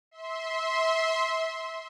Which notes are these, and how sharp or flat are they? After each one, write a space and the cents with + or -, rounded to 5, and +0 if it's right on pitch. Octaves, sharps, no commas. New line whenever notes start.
E5 -25 C6 +0